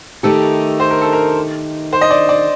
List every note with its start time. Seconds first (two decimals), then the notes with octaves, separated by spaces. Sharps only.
0.23 D#3 A3 D#4 G4 A4
0.80 C5
0.91 A#4
1.02 A4
1.13 A#4
1.93 C5
2.01 D#5
2.11 D5
2.29 D5